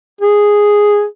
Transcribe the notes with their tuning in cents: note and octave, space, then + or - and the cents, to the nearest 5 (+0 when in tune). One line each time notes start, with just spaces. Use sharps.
G#4 -5